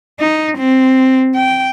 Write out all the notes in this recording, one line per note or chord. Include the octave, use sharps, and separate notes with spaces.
D#4
C4
G5